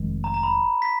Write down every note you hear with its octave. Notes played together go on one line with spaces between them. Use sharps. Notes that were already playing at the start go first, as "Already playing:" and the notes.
Already playing: F1 D#3 G#3
A#5
A#5
B5
B6